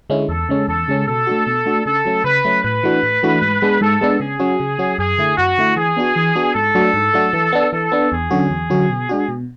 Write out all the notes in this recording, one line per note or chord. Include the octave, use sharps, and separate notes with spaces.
D3 G#3 C#4 E4
E2 A4
C#3 G#3 C#4
E2 A4
C#3 G#3 C#4
B2 A4
A3 D4 F#4
B2
A3 D4 F#4
C#3 A4
F#3 A3 C#4
C#3 B4
F#3 A3 C#4
A2 B4
E3 A3 D4 F#4
A2
E3 A3 D4 F#4
G#2
G#3 B3 D4
G#2 A4
G#3 B3 D4
C#3 G#4
F#3 C#4 F#4
C#3
F#3 C#4 F#4
F#2 G#4
D3 A3 E4
F#2 F#4
D3 A3 E4
E3 G#4
B3 D4 F#4
E3
B3 D4 F#4
G#2 A4
F#3 A3 D4 F#4
G#2
F#3 A3 D4 F#4
E3
B3 D4
E3 A4
B3 D4
E2 G#4
D3 F#3 C#4 F#4
E2
D3 F#3 C#4 F#4
B2
G#3 D4 F#4
B2